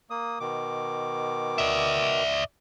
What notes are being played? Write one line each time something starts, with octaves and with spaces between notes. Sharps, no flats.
A#3 D#6
B2 D#3 D6
D5 E5